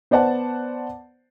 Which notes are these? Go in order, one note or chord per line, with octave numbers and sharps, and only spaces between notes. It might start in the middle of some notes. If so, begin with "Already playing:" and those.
B3 C5 D5 F#5 A5